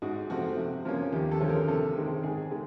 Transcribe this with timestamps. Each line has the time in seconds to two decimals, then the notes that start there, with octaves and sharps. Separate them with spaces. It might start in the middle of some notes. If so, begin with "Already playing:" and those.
0.02 G#2 F#4
0.30 F3 A3 C4 F#4
0.57 C3
0.85 F3 A#3 C#4
1.12 D#2 G4
1.31 A4
1.40 D3 F3 G#3 C#4
1.49 A#4
1.68 C3 A4
1.95 D#3 G#3 C4
2.23 G#2 G#4
2.51 D#3 G#3